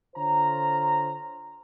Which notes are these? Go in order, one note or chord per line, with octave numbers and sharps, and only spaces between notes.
D3 F4 C5 C#5 A#5